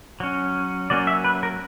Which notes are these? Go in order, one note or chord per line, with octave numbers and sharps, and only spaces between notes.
F#3 C#4
F#3 A#3 C#4 D5
E5
B4
A#4